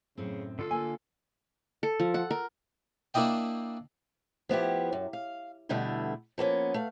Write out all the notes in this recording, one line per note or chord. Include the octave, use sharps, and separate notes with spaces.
F#2 A2 C#3 C4
D3 F4 A4 E6
A#3 G#5
A4
F3
F#5
A#4
A#3 D4 E4 D#5 G5
F3 B3 E4 G4
F#2
F5
E2 B2 D3 G3 A3 E4
F3 A#3 B3 C#4
A3 F5